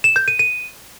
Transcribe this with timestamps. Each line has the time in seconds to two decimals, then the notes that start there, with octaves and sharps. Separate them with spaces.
0.04 E7
0.16 G6
0.28 D#7
0.39 D#7